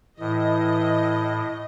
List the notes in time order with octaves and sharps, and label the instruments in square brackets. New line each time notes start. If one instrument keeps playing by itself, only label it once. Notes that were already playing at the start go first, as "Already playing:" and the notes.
[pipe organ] A2 [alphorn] E3 [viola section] D#5